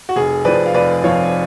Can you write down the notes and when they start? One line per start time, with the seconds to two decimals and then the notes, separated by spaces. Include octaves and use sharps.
0.09 F#4
0.16 F1 G#4
0.45 F2 F3 B4 D5
0.66 F5
0.74 F1 B4 D5
1.04 F2 F3 C#5 F5